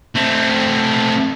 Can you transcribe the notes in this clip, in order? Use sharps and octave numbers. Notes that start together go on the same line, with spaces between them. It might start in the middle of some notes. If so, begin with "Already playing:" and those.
A3 C4